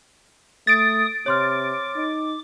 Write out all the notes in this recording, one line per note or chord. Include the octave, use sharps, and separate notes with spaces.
A3 D#6 A6 D7
C3 C#5 C6 D6 F6
D#4